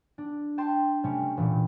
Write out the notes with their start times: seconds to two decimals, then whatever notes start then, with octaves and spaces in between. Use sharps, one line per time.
0.18 D4
0.58 G5 A5 C6
1.04 C3 G3 A3 C#4
1.37 E1 A#2 E3